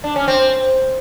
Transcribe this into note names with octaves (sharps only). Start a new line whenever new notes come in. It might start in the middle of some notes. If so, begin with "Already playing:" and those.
D4
C#4
C4